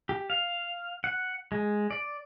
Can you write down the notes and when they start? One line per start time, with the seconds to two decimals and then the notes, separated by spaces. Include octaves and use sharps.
0.09 G4
0.30 F5
1.04 F#5
1.52 G#3
1.91 D5